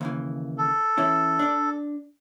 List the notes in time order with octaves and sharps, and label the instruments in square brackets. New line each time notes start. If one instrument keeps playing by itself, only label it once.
[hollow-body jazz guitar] D#2 C#3 E3
[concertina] A4
[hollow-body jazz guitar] E3 C#4 E4
D4 D5